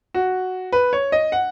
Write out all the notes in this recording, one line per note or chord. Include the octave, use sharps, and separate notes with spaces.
F#4
B4
C#5
D#5
F#5